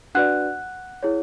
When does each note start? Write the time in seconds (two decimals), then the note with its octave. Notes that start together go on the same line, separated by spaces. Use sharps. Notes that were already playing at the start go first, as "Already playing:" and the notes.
0.15 D4 F#4 B4 D5 F#5 F#6
1.03 E4 G#4 C#5